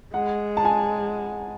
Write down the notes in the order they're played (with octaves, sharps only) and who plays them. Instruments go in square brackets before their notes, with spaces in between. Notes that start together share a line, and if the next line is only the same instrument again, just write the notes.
[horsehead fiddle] G#3 [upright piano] F#5
[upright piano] A5
G#5